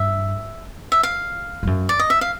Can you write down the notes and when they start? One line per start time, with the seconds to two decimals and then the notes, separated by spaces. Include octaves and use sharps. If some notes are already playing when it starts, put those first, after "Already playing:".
Already playing: G2 E5
0.92 E5
1.03 F5
1.63 G2
1.67 F#2
1.89 D5
1.99 D#5
2.10 E5
2.21 F5